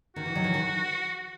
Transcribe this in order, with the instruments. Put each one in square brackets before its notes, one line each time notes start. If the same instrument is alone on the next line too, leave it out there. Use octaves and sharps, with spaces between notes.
[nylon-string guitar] D#3 [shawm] F#4
[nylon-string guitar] E3
D#3 F#3
E3
D#3